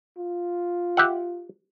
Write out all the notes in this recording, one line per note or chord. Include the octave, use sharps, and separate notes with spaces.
F4
G4 E5 F#5